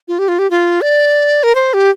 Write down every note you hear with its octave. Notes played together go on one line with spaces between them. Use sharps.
F4
G4
F4
G4
F4
D5
A#4
C5
G4